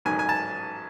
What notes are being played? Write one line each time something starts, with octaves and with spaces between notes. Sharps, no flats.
A1 G#2 D#3 F#3 G#5
G#5
A5